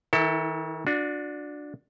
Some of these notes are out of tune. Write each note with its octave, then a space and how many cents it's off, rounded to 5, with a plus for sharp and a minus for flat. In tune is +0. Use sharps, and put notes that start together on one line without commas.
D#3 +40 E4 -15 A4 +25
D4 +0 F#4 -35